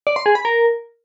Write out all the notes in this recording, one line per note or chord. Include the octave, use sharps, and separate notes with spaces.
D5
C6
G#4
B5
A#4